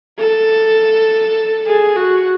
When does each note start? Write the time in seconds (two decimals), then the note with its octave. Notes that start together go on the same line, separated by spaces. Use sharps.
0.19 A4
1.67 G#4
1.96 F#4